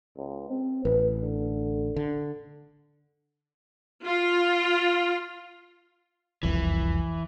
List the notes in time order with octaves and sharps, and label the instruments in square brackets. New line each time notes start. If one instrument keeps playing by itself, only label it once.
[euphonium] C#2
C4
[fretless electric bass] A1 [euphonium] B4
[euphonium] D3
[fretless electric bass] D3
[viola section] F4
[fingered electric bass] E1 C2 F2 [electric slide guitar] E3